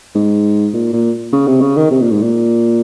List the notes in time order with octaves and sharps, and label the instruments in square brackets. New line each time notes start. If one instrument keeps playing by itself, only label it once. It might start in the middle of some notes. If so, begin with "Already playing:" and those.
[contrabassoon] G#2
A#2
A#2
C#3
C3
C#3
D#3
C3
A#2
G#2
A#2